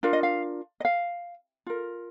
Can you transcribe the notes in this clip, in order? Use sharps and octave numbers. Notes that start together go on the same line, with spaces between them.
D4 F4 A#4 F5
D#5
F5
D#5
F5
F4 A#4